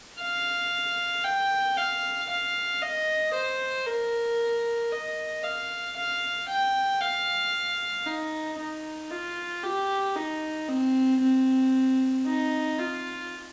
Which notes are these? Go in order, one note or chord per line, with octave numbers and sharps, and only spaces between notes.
F5
G5
F5
F5
D#5
C5
A#4
D#5
F5
F5
G5
F5
D#4
D#4
F4
G4
D#4
C4
C4
D#4
F4